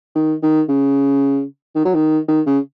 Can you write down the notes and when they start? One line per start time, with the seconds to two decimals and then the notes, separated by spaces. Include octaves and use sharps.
0.15 D#3
0.43 D#3
0.69 C#3
1.76 D#3
1.85 F#3
1.95 D#3
2.28 D#3
2.46 C#3